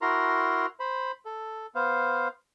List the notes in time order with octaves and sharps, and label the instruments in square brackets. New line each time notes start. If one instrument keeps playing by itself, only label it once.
[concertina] E4 F#4 A#4 A#5 C6
C5 B5
A4
B3 C5 F5